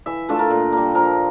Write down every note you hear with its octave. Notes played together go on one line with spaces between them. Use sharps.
E3 E5
A3 D4 F4 A4
A#4
A#2
G3 A#3
F3 A#4